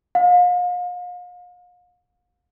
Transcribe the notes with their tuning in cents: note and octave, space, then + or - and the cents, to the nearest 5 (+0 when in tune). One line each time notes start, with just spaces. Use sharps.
F5 +40